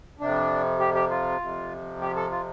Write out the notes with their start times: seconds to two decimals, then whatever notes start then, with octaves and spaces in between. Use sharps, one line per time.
0.20 F2 C3 D4
0.80 G4
0.95 G4
1.10 F4
1.41 F2 C3
2.01 G4
2.16 A4
2.31 F4